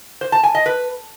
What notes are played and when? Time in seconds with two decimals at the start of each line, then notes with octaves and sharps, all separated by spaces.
0.21 C5
0.32 A5
0.43 G#5
0.55 D#5
0.66 B4